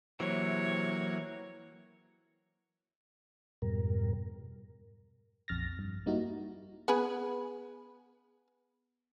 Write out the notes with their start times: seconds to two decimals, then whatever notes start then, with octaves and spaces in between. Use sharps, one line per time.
0.20 C3 E3 F#3 A#3 C#5
3.62 F2 G#2 B2 G3 A#4
5.48 A#1 F2 F6 A6 A#6
5.79 G2
6.06 G3 A#3 D#4 E4 F#4
6.88 B3 G#4 B4